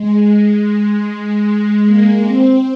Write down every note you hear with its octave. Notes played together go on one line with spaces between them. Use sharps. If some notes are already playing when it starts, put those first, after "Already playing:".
Already playing: G#3
G#3
G#3
A#3
C4